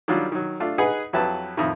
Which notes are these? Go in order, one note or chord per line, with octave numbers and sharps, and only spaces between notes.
D#3 F#3 G3 D4 F4
D#3 F#3
A3 D4 F4
D#4 G#4 B4 F#5
F2 F#3 E4 G4 B4 A5
F2 A2 D#3